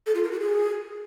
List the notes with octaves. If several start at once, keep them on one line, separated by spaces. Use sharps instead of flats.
A4
F4
A#4
F#4
G#4